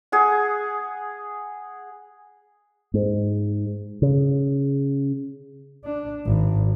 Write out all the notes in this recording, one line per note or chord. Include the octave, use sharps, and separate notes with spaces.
G#4 F#5
G#2
C#3
D4
G#1